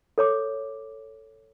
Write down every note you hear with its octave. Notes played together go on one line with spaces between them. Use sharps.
A4 C#5 D6